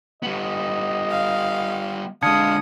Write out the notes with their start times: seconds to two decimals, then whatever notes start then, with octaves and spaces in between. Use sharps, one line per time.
0.23 G3 B3 D#5
1.10 F5
2.23 D3 G#3 D4 F5 D#6 G#6 C#7